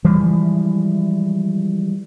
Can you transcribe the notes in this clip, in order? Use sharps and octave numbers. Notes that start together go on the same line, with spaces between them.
E3 F3 G3 G#3